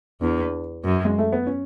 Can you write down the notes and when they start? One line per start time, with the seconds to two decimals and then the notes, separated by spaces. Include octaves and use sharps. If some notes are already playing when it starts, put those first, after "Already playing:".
0.21 E2 D4
0.84 F#2
1.05 G#3
1.19 A3
1.33 B3
1.47 C#4